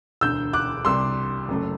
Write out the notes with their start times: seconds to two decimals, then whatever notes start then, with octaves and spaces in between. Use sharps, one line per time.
0.21 E1 D2 D3 E6 G6
0.53 D6 F#6
0.85 C2 C3 G3 C6 E6
1.48 F#1 F#2 F#3 A3